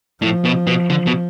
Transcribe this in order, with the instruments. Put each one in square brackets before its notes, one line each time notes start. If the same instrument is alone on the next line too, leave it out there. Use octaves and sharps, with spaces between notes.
[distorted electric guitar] A2 [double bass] F3
[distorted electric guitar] B2
B2
D3
B2